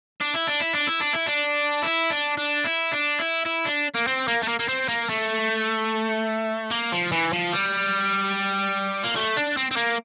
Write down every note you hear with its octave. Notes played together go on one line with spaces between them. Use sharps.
D4
E4
D4
E4
D4
E4
D4
E4
D4
E4
D4
D4
E4
D4
E4
E4
D4
A#3
C4
A#3
A3
A#3
A#3
C4
A#3
A3
A#3
F3
E3
F3
G3
A#3
A3
D4
C4
C4
A#3